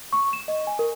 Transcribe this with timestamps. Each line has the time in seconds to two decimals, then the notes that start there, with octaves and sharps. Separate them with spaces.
0.13 C#6
0.33 E7
0.48 D#5
0.67 G#5
0.79 A#4